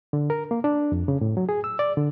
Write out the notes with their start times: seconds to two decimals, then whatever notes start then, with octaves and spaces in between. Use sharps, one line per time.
0.13 D3
0.30 A#4
0.51 A#3
0.64 D4
0.92 F2
1.08 C#3
1.21 A2
1.37 F#3
1.49 G#4
1.64 E6
1.79 D5
1.97 D3